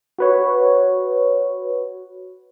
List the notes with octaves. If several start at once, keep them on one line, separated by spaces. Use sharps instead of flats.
F#4 B4 C#5